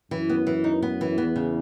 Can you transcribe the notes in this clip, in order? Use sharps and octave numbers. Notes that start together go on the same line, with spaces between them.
F#2 E3
B3
E3
D#4
B3
E3
E2 B3
C#3